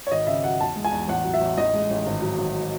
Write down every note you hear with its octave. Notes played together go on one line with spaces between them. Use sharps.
C#5
G#1 D#5
C#3 E5
F#3 F#5
E2 A5
G#3
G#5
E2
A1 F#5
F#3
E5
A1
A1 D#5
G#3
A1
G#1
F#3
G#1